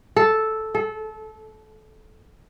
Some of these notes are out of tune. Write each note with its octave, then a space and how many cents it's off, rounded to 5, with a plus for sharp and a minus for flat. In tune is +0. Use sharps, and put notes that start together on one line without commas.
A4 -5
A4 -25